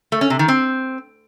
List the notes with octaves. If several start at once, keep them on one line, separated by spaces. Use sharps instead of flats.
A3
C#4
C3
D#3
C4